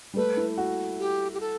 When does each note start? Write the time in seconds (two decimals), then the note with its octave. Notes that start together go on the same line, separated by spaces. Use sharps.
0.14 G3
0.16 A3 B4
0.37 E4
0.58 F#4
0.99 G4
1.34 G4
1.40 A4